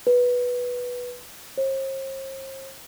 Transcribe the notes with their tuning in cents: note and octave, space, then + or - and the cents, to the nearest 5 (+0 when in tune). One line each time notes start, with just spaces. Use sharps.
B4 -10
C5 +45